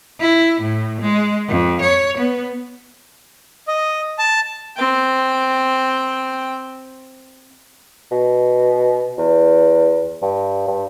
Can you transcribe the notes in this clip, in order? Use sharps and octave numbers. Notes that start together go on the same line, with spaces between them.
E4
A2
G#3
F2
C#5
B3
D#5
A5
C4 G5
B2
E2
G2
G2